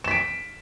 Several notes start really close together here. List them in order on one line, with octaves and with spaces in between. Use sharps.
E7 B6 D7